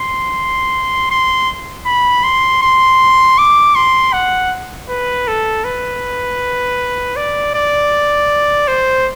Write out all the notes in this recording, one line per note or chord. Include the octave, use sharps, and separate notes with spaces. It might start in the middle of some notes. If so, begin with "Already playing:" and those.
Already playing: C6
C6
B5
C6
C6
D6
C6
F#5
B4
A4
B4
D5
D5
C5